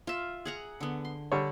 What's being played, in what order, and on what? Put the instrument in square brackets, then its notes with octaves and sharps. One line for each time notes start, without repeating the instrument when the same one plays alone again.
[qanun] F4 E5
G#4 F#5 A#5
D3 B3
C6
[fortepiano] D3 G3 C#5